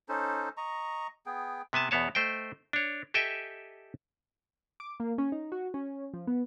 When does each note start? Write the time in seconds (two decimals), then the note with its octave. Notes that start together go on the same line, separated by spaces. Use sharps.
0.09 C#4 D#4 A4 C5
0.57 D#5 A#5 C#6
1.26 B3 G#4 G5
1.73 C3 B3 G#5 A5
1.91 E2 B2 B3 C#5 A5
2.15 A3 C5 D#5 G5
2.73 D4 C#5
3.14 G4 A4 D#5 E5 G5 G#5
4.80 D6
5.00 A#3
5.18 C#4
5.32 D#4
5.52 F#4
5.74 C#4
6.14 F3
6.27 B3